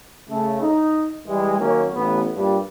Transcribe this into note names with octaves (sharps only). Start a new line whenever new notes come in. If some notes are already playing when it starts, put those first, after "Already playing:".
C#3 A3
D#4
E3 G3 G#3
D#3 F#3 A#3 C#4
A1 B3
G2 A#2 G3